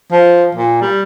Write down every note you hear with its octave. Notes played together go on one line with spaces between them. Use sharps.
F3
A#2
G3